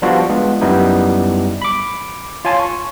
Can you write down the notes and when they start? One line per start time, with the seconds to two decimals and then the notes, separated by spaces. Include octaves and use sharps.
0.02 F3 G3 B3 D4 F4 F#4
0.29 G#3 B3 D4 F4
0.61 F#2 G3 B3 D#4 E4
1.62 B5 D6
2.45 F4 C#5 G#5 A5 C6
2.59 C#6